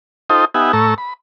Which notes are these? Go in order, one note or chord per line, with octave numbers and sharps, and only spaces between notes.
D#4 F4 A4 C5 D#5 G5
B3 D#4 G4 E5 F#5 G#5
A2 A3 A4 A#5 C#6 E6
B5